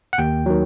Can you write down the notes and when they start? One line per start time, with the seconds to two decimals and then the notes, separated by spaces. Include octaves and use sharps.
0.13 F#5
0.18 D#2 G5
0.46 D#3 F#3